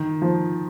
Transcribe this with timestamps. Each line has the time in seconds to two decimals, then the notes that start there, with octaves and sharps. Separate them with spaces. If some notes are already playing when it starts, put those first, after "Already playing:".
Already playing: D#3
0.22 F3